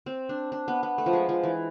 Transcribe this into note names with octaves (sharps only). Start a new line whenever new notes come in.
C4
D4
D4
B3
B3
A3
F3
G#3
F3
E3